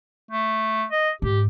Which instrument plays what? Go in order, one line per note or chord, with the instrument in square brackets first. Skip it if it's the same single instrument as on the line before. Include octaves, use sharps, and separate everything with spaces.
[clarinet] A3
D#5
[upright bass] G#2 [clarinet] G4